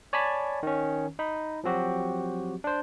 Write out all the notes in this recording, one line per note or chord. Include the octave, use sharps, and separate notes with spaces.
C#5 D5 G#5 A5 B5 B6
D#3 C#4
D#4 B5
F3 F#3 C4 F#4 G4
D4 C5